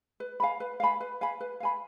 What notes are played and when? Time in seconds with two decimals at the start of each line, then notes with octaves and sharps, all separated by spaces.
0.20 B4
0.40 F5 G#5 B5
0.60 B4
0.80 F5 G#5 B5
1.00 B4
1.21 F5 G#5 B5
1.40 B4
1.60 F5 G#5 B5